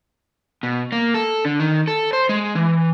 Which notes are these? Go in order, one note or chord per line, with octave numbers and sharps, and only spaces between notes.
B2
A#3
A4
D3
D#3
A4
C5
G#3
E3